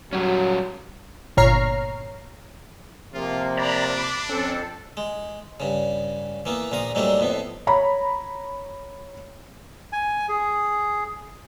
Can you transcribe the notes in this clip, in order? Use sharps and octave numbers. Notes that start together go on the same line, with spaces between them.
F#3 G3 C#4
G1 A#2 C#5 A#5 F6 C7
C3 F3 A#3 F4
D4 D5 A#5 B5
B5 D6
F2 C4 C#4 A4
G#3
G2 C#3
E3 A#3 B3
A#1 A#2 A#3 A#5 D#6
G#2 F#3 G3 A3 A#3 D4
F2 A2 B3
C#5 A#5 B5
G#5
G#4